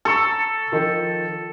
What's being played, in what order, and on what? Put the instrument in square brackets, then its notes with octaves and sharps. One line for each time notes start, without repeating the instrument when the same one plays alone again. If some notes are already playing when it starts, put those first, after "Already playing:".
[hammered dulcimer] A4 [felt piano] A#5 C#6 E6
[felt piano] D#3 F3